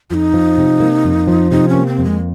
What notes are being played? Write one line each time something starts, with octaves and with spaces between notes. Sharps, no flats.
F2 D#4 F4
F3
C3
A#3
F2
F3
C3 D#4
C#4
A#3
C4
F2
G#3